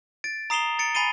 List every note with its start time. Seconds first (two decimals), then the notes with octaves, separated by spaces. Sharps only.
0.24 A6 D7
0.50 A#5 D#6 C7 E7 F7 G7
0.79 A6 C#7 D7
0.94 G#5 B5 A6 C7 D#7 G7